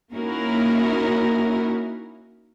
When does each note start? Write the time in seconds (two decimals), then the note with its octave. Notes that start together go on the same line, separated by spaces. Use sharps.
0.12 A#3 C#4 D#4 E4 F#4 A#4